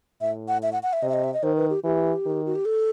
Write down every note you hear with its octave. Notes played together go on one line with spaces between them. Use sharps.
A2 E5
F#5
E5
F#5
F#5
E5
C3 D#5
E5
D#5
E5
D#5
D#3 C5
B4
G4
E3 G4
D#3
F#4
G4
A4